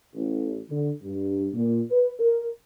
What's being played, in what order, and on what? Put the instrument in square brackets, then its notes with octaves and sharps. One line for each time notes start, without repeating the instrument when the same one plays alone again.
[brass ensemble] A1
D3
G2
A#2
B4
A#4